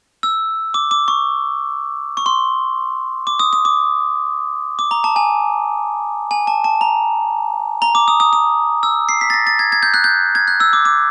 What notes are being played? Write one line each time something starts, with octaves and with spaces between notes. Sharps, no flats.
E6
D6
D6
C#6
C#6
C6
D6
D#6
D#6
D6
D6
A#5
A5
G#5
G#5
A5
A5
A#5
A#5
D6
D#6
D#6
D#6
E6
C7
B6
A6
A#6
A6
G#6
G#6
G6
F#6
G6
G#6
F#6
E6
D6
D6